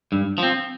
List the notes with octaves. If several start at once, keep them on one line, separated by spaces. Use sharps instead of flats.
G2
F3 C4